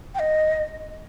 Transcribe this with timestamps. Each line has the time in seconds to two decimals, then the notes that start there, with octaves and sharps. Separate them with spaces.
0.15 G5
0.19 D#5